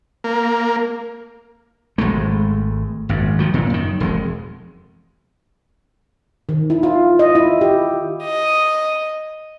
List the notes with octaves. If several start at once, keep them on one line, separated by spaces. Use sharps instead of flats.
A#3
G#1 C#2 G#3 A3
G#1 F#2
D#3 F3 F#3
A#2 C#3
F#2 D#3
E1 F2 G#3
D#3
E4
F4
D#5
E4
G4
D#5